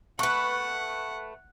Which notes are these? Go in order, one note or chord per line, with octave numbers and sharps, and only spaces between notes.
A3 B4 F#5 C#6